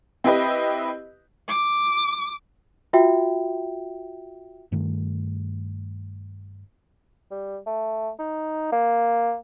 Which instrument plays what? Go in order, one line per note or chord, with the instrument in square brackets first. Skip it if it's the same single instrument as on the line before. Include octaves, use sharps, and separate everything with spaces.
[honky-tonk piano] C4 E4 G4 B4 D#5
[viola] D6
[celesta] F4 F#4 E5 G5
[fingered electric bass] G2 D#3 A3
[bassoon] G3
A3
D#4
A#3